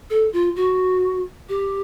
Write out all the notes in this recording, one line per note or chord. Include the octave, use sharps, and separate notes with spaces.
A4
F4
F#4
G4